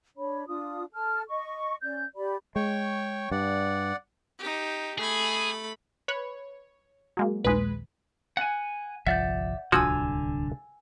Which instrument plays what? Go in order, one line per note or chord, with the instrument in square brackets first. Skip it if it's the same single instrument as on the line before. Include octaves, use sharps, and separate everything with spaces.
[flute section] D4 C#5 B5
D4 F4 D#6
A4 A5 F6
D#5 C#6
C#4 D5 G6
G4 D5 B5
[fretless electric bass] G#3 [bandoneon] C#5 G5 C#6
[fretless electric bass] G2 [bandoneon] D5 F#5
[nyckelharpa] D#4 G4
[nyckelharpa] A3 B5 [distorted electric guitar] G#4
[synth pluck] B4 B5 [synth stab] C#5
[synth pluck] F#3 G#3 A#3
[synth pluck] A#1 D#2 [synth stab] G#3 B4
[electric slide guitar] F#5 G#5
[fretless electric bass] G1 C2 F3 [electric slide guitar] D5 E5 [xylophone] F#5 G6
[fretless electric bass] D1 C2 [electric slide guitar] D3 [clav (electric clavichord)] F3 F#4 [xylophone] G#5 E6 G#6